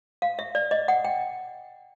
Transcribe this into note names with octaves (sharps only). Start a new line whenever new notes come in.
F5
E5
D5
D#5
F#5
G5